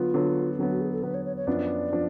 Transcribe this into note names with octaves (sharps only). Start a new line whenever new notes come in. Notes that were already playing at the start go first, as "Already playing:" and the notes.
Already playing: D3 F#3 B3 F4
D3 F#3 B3
D3 F#3 B3
F#4
G#4
A4
D3 F#3 B3 B4
C#5
C#5
C#5
F#2 F3 B3 D4 D5
F3 B3 D4